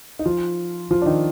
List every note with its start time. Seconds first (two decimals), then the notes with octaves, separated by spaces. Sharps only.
0.19 D#4
0.26 F3 F4
0.91 F3 F4
1.02 D4
1.06 D#3 D#4